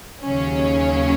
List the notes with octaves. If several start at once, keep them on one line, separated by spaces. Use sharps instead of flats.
D#2 C#3 F#3 C#4